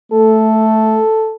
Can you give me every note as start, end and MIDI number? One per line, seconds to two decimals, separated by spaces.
0.13 1.00 57
0.13 1.35 69